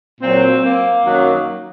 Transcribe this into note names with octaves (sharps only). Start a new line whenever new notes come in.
A#2 F#3 C4
A#3
F#2 D#3 F#3